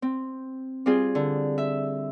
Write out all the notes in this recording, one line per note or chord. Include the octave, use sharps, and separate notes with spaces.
C4
G3 C4 F4 G#4
D3
E5